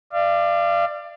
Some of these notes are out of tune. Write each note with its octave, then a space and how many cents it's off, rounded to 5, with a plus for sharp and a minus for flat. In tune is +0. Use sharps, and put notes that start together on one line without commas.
D5 +20 F5 -30